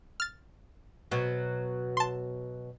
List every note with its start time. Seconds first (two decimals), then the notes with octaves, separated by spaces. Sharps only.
0.20 F6 A6
1.11 B2 F#3
1.97 A5 C6